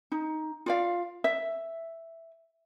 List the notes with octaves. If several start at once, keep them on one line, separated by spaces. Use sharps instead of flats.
D#4
F4 D5 F5
E5